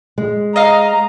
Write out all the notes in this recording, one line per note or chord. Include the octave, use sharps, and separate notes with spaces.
G#3
D#5 F5 A#5